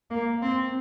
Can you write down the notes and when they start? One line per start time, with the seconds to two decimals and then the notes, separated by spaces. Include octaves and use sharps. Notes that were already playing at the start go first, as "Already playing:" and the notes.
0.11 A#3
0.42 C4